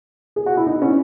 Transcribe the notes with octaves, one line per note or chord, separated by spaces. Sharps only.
G#4
F#4
E4
D#4
C#4